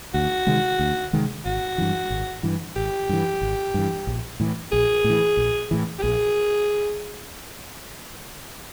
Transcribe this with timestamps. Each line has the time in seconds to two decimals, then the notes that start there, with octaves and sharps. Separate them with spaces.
0.14 D2 F#4
0.47 C3 D#3 G#3
0.79 D2
1.13 C3 D#3 G#3
1.45 G#1 F#4
1.78 G2 E3
2.10 G#1
2.43 G2 E3
2.76 G#1 G4
3.09 G2 E3
3.41 G#1
3.74 G2 E3
4.07 A#1
4.40 A2 E3
4.72 A#1 G#4
5.04 A2
5.10 E3
5.37 A#1
5.71 A2 E3
5.99 G4
6.03 A#1 G#4